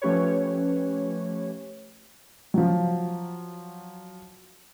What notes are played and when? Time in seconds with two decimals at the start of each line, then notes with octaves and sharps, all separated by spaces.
0.02 F3 A3 C#4 G4 B4 C#5
2.54 F3 F#3